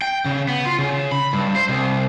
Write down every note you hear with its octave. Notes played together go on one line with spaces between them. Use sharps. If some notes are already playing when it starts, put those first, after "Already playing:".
G5
C#3
B3
F4
C#3
B5
G2
C5
C2